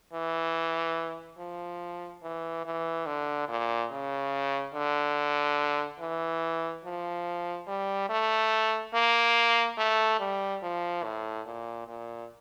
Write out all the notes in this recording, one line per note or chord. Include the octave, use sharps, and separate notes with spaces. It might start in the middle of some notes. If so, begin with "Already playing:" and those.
E3
F3
E3
E3
D3
A#2
C#3
D3
E3
F3
G3
A3
A#3
A3
G3
F3
A2
A#2
A#2